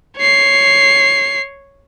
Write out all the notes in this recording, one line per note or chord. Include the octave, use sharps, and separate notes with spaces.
C#5 C7